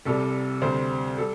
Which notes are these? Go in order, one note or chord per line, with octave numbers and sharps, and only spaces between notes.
C2 C3 G3 A4
D2 C3 G3 C5
G3 A4